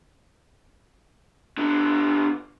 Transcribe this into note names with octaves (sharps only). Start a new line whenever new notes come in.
D3 B3